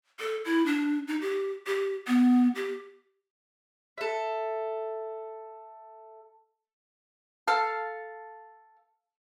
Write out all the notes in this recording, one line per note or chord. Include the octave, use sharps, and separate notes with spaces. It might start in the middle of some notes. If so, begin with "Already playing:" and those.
A4
E4
D4
D#4
G4
G4
B3
G4
A4 E5
A4 F5 A5